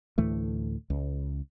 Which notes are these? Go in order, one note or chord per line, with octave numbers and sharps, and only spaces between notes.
D2 A2 E3 A3
C#2